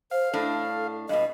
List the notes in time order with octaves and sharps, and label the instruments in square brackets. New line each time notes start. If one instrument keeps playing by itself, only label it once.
[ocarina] C5 [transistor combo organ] F5
[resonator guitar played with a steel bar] A2 D4 [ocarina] A4
[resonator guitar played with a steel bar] G2 B2 [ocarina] D#5